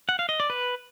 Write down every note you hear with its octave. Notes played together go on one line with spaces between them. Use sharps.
F#5
F5
D#5
D5
B4